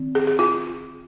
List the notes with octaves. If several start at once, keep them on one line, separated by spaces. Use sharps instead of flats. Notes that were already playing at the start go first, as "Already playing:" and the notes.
Already playing: D#3 C4
G#4
G#4
F4